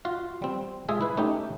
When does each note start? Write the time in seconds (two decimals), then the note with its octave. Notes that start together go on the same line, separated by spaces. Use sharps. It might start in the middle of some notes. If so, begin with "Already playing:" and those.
0.05 F4 F#4 F5
0.42 G3 C4
0.89 G#3 F4 G#4 E5
1.01 E4 B4
1.17 A3 C#4 D#4 G4